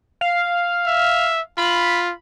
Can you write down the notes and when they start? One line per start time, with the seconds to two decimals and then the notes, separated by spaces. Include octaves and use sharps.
0.21 F5
0.87 E5
1.58 F4 B5